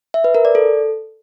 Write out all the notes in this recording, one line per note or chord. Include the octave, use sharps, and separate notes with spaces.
E5
B4
A#4
D5
A4